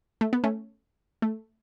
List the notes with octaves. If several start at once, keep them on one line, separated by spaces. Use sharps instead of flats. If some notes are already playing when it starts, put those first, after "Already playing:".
A3
B3
A3 C#4
A3